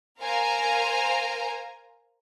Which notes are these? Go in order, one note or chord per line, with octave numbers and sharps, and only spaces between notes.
A#4 C5 F5 G#5 A#5